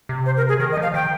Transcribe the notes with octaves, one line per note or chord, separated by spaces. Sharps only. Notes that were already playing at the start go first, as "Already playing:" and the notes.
C3
C5
A#4
G#4
D#3 A#4
D#5
F3
F5
D#3 G5